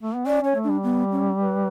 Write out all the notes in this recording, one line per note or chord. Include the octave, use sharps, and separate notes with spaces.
A3
B3
C#4 D5
C#4 C#5
A3
D4
G3
B3
C#4
B4